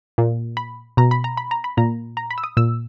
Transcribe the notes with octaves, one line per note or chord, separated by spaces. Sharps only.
A#2
B5
B2 A#5
B5
A#5
B5
A#5
B5
A#2 A#5
A#5
B5
E6
D#6
A#2 E6